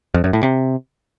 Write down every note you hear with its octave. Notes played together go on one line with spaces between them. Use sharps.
F2
F#2
A2
C3